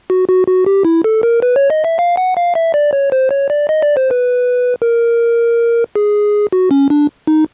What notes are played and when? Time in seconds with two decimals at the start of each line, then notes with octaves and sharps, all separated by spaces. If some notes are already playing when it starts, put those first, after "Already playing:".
0.10 F#4
0.28 F#4
0.48 F#4
0.66 G4
0.85 E4
1.04 A4
1.23 A#4
1.42 B4
1.56 C#5
1.70 D#5
1.85 E5
1.99 F5
2.17 F#5
2.37 F5
2.55 E5
2.74 D5
2.93 C#5
3.12 C5
3.31 C#5
3.50 D5
3.69 D#5
3.82 D5
3.97 C5
4.11 B4
4.82 A#4
5.96 G#4
6.52 F#4
6.71 C#4
6.90 D4
7.27 D#4